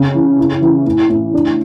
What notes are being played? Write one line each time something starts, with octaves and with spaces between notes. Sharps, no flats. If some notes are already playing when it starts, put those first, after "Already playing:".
Already playing: C#3
E3
E4
E3
A2
A2
D4